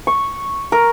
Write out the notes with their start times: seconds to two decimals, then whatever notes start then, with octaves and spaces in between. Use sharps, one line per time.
0.07 C#6
0.72 A#4